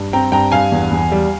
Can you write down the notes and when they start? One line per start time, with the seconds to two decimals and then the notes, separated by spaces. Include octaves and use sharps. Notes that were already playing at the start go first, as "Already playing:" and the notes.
Already playing: G2
0.13 C4 G5 A#5
0.32 G2 G5 A#5
0.52 G2 F5 G#5
0.72 E2
0.91 E2
1.12 G3